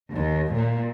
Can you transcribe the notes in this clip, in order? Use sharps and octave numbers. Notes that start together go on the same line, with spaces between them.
D#2
A#2